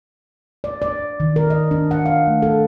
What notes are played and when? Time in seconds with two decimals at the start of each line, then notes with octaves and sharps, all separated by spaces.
0.64 D5
0.82 D5
1.20 D#3
1.36 A#4
1.50 D#5
1.71 D4
1.91 F#5
2.06 F5
2.27 A3
2.42 A4